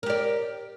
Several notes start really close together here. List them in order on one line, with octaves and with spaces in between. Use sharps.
A#4 G4 D5